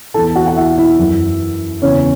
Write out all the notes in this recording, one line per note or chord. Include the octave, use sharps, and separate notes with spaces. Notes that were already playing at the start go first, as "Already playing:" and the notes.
E2 E3 A4 A5
F#4 F#5
F#5
E4 E5
E4 E5
F#2 E3
E2 C#3 E3 C#4 C#5